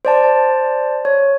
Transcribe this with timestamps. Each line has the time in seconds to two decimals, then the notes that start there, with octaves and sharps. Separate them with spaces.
0.05 C5 D5 A5
1.05 C#5